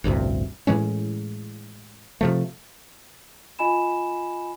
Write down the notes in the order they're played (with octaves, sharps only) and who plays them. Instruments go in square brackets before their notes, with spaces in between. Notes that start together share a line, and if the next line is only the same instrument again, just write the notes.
[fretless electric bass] A1 D2 G2 C3
A2 E3 G#3 C#4
C3 F3 A3
[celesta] F4 D#5 G#5 B5 E7